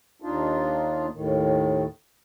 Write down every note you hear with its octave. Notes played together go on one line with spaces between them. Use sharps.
D#2 D4 D#4 F4
D#2 A2 D#3